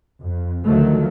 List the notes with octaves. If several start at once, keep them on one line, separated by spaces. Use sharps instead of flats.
F2
D2 D#3 F3 F#3 A3